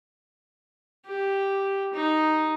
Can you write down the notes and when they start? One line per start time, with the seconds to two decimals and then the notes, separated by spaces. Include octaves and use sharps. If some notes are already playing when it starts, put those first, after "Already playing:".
1.06 G4
1.93 D#4